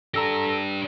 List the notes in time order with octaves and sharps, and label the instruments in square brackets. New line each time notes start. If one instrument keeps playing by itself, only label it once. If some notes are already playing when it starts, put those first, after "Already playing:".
[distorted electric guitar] D4 G4 [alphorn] A4 [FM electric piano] A#5 E6 A#6